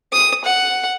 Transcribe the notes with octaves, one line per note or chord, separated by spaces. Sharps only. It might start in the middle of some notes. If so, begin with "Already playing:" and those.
D#6
F#5